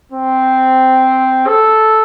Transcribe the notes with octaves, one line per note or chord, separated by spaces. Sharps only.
C4
A4